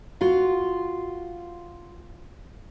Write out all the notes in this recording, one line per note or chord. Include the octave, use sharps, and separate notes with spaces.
F4 F#4 F5